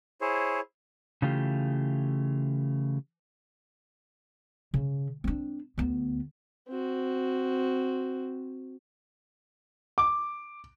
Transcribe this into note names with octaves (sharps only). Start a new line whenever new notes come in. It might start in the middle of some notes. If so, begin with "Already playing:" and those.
E4 G#4 C5 C#5
C#3 E3 A3 F4 G4
C#3
C4 D4
D2 B3
C4 F#4
D6